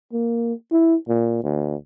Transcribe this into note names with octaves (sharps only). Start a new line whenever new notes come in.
A#3
E4
A#2
D2